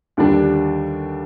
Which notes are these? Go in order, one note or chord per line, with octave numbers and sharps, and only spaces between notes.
D#2 D3 G3 D4